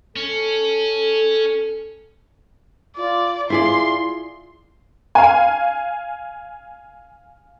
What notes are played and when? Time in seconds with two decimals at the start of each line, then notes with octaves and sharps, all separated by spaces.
0.16 C#4 A4
2.96 F4 D5
3.50 E4 F4 G#4 D5 C6
5.15 F5 G#5